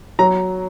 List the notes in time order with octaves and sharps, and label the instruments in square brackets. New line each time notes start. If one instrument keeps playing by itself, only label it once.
[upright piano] F#3 A#5